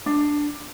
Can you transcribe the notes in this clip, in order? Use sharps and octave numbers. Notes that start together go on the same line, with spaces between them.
D4